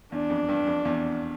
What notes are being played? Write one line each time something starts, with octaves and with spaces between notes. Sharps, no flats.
E2 D4
F2
G2
F2
E2